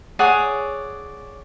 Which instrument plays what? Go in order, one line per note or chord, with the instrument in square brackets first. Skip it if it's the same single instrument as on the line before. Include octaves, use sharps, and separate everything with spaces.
[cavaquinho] G#4 C#5 D5 F#5